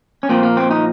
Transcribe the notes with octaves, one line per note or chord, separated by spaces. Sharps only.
C#4
A#2 F3 A#3 C4
A#3
C4
D#4